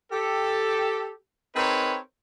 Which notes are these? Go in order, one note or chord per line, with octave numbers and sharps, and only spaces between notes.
G4 A4
C4 D#4 G#4 A#4 B4 C#5